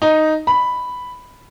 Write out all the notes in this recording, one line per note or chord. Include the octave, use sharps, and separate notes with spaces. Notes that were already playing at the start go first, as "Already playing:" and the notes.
D#4
B5